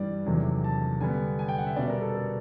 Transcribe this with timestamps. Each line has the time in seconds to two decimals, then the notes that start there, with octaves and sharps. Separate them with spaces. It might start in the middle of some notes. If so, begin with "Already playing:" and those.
Already playing: G2 E3 G3 D5
0.26 E2 C3 D#3 F#3 A3
0.64 A5
1.01 D3 G3 B3 G#5
1.39 G#5
1.49 G5
1.58 F#5
1.66 E5
1.76 B2 G3 B3 D4 D5
1.90 A#4
2.01 A4
2.15 A4